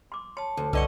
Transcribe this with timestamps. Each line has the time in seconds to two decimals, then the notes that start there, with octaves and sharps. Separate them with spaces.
0.12 C6 D6
0.37 C#5 A5 C6
0.57 D2
0.73 C2 D3 B4 D5 D#5 F#5 C#6